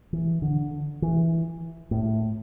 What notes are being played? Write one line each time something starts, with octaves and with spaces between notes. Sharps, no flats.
E3
D3
E3
A2